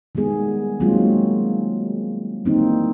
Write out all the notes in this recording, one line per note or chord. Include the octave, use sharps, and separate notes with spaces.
D#3 G3 G#3 B3 G#4
D#3 F#3 G#3 A#3 C4 F4
D#3 E3 G3 A#3 C4 D#4